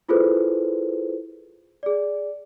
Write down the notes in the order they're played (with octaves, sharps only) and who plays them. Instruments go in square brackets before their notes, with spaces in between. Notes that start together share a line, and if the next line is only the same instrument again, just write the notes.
[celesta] E4 F4 G#4 A4 B4 C5
G#4 D5